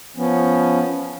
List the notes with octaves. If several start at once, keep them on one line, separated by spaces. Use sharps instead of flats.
F3 B3 C#4